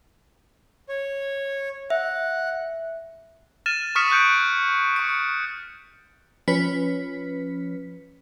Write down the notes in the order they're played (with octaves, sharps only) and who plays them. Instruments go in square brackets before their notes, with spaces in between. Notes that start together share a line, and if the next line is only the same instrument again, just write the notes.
[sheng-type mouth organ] C#5
[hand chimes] E5 [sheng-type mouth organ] F#5
[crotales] F6 A6 D#7 E7
C#6 D#6 F6 B6 C#7 E7
C#6 F#6 G6 C#7 D7
C#6 C#7
[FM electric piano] F3 C#4 B4 B6